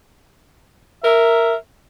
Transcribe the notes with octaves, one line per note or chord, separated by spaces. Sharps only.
A#4 E5